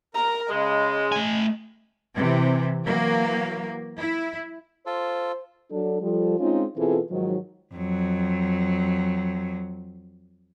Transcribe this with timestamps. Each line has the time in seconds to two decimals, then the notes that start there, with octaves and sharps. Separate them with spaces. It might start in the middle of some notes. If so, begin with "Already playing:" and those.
0.14 A#4 A#5
0.50 C#3 G#3 D#5
1.12 A3 G#5
2.15 C3 E3
2.84 E3 F#3 A#3
3.98 E4
4.86 F4 A4 C5
5.71 F#3 D4 A4
6.01 F3 G3 A4
6.39 G#3 C4 C#4 D#4 F4
6.77 B2 E3 C4 F4 G#4 A4
7.10 G#2 D#3 F3 F#3
7.75 F2 F#3